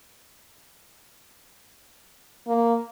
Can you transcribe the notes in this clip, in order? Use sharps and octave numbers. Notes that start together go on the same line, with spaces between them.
A#3